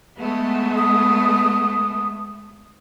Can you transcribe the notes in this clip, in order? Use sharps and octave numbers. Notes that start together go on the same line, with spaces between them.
G#3 A3 B3
D#6